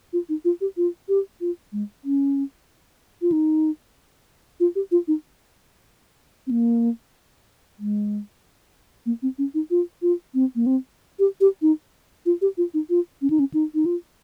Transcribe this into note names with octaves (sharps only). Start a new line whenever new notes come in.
F4
D#4
F4
G4
F4
G4
F4
G#3
C#4
F4
D#4
F4
G4
F4
D#4
C4
A#3
G#3
A#3
C4
C#4
D#4
F4
F4
C4
A#3
C4
G4
G4
D#4
F4
G4
F4
D#4
F4
C#4
D#4
C#4
D#4
D#4
F4